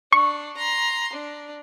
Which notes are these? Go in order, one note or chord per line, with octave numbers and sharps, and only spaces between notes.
D4 C#6
A#5 C6
D4